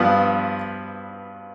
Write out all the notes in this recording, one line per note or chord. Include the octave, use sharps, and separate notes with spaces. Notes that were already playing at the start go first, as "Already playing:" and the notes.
Already playing: G2 F3 B3